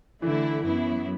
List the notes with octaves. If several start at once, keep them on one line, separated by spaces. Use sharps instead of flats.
D3 E3 A3 E4
F#2 F#3 B3 E4